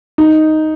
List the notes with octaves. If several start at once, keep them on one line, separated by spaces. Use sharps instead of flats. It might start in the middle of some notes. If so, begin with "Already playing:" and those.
D#4